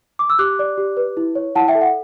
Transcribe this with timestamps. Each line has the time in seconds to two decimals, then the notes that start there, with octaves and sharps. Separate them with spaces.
0.19 D6
0.30 E6
0.39 G4 D6 F#6
0.59 D5
0.78 G4
0.97 B4
1.17 E4
1.35 C#5
1.55 E4 F#5 A5
1.68 E5 G5
1.75 A4
1.81 F#5